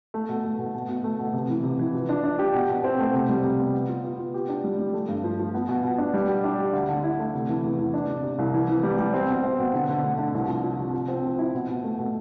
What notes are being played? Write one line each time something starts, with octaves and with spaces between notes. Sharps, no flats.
A3
B2
A3
B2
B2
B2
A3
B2
C3
E3
C3
E3
F3
D4
D4
G4
B2
B2
C4
A3
C3
G3
C3
B3
B3
F4
B3
F4
G4
D4
G3
G3
A3
G2
F3
F3
B3
B2
B2
D4
G3
G4
D4
G4
D2
D3
E4
A3
C3
E3
E2
E3
D4
C3
C3
C2
E3
E3
G3
G3
C4
B2
C4
B2
D3
D3
A3
D3
C2
F3
F3
C3
F3
C4
F3
E4
B2
B2
A3
B2